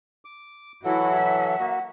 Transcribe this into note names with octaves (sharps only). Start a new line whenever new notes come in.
D6
E3 F#3 E4 F#4 A4 F#5
E5
A#3 F#4